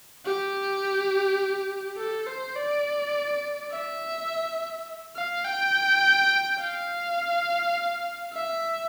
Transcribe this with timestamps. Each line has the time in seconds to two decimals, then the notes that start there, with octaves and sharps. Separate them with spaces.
0.25 G4
1.97 A4
2.27 C5
2.56 D5
3.71 E5
5.16 F5
5.44 G5
6.60 F5
8.33 E5